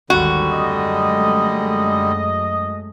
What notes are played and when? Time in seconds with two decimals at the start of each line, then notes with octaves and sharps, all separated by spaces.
0.10 G#1 D#2 D3 G3 F#4
0.51 F#2 G#3 A3 D#5